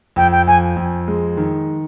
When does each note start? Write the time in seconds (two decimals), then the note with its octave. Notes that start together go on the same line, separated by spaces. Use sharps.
0.16 F2 G5
0.32 G5
0.47 F2 G#5
0.77 F2
1.08 G#3
1.37 D#3